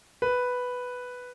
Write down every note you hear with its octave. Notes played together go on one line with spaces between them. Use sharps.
B4